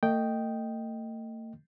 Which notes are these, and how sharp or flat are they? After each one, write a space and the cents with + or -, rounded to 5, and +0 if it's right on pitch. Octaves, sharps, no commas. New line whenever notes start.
A3 +40 D#5 +0 G5 -5